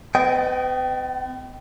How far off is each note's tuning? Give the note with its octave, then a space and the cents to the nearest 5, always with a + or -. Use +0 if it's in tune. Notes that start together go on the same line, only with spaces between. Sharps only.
B3 +45 D#5 +0 G5 -15